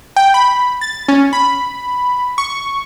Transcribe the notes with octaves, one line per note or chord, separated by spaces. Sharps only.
G5
B5
A6
C#4
B5
C#6